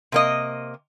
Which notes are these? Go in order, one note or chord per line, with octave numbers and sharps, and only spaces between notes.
C3 A#3 D#5